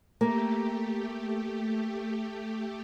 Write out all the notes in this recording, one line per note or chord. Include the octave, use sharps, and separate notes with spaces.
A3 A#3 G4